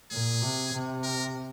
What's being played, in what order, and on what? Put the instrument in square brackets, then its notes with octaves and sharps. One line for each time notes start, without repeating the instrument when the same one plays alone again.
[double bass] A#2 [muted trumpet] G#4
[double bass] C3
C3
[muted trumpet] A#4